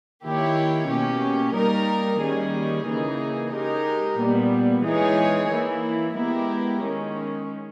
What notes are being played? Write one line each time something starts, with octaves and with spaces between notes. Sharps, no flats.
D#3 A#3 E4 G4 C#5
B2 A#3 C#4 G4
G3 A#3 D#4 A#4
D#3 G3 A#3 C#4 G#4
C#3 E3 A#3 D#4 G#4
G#3 D#4 G4 A#4
A#2 G3 B3
E3 G#3 D#4 G#4 C#5
E3 A#3 E4
G#3 B3 E4 G4 A#4
D#3 G#3 C#4